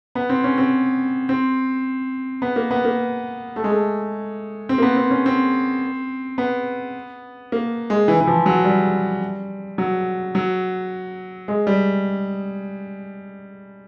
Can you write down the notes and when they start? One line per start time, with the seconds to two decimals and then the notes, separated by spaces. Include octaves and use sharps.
0.15 B3
0.30 C4
0.44 C#4
0.58 C4
1.29 C4
2.42 B3
2.56 A#3
2.71 B3
2.85 A#3
3.56 A3
3.64 G#3
3.72 A3
4.69 C4
4.78 A#3
4.82 B3
4.96 C4
5.11 C#4
5.26 C4
6.38 B3
7.52 A#3
7.90 G#3
8.08 E3
8.21 E3
8.27 F3
8.46 F#3
8.65 G3
9.78 F#3
10.35 F#3
11.48 G#3
11.67 G3